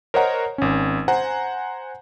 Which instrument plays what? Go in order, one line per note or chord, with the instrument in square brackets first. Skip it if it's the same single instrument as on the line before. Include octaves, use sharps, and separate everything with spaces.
[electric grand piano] A#4 C5 C#5 D#5 F#5 A#5
G#1 C#4
C5 F#5 G#5 A#5